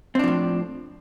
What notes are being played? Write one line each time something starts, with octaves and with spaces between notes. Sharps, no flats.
A2 F3 C4 D4